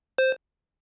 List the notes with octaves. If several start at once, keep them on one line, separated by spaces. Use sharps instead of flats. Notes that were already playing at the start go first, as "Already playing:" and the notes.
C5